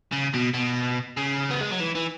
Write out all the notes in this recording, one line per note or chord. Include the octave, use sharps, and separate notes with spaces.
C#3
B2
B2
C#3
B3
G#3
F#3
E3
E3